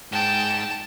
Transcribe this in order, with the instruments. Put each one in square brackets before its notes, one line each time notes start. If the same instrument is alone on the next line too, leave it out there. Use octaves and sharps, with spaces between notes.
[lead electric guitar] G#2 [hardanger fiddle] G5 [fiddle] A5